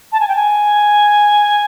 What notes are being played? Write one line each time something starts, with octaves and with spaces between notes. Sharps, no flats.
A5
G#5
G5
G#5